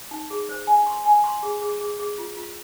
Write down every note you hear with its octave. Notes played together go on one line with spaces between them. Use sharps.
D#4
G#4
C5
G#5
C6
G#5
C6
G#4
G#4
G#4
G#4
F4
F4